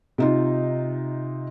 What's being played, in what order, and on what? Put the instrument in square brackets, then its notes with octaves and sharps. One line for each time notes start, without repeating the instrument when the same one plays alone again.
[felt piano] C3 D#4 F4